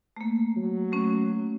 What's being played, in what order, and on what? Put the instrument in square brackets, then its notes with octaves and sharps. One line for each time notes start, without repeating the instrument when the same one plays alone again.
[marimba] A3 A#3
[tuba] F#3
[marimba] A3 C#4